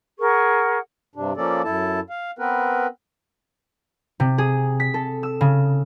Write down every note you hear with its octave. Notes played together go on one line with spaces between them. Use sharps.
G#4 A#4 F#5 C#6
G2 C3 D4
F3 A#3 C#4 A4 D5
F#2 E4 A4 A5
F5
B3 C4 A#4 B4
C3
G#4
B6
A4
E6
C#3